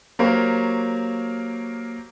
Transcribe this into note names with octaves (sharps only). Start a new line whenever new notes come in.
F#3 A#3 G4 A#4 C5 C#5